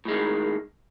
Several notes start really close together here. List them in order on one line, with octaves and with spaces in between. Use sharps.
A2 G#3 D#3